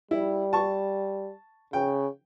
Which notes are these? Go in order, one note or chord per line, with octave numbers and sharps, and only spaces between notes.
G3 E4
A5 C#6
C#3 G5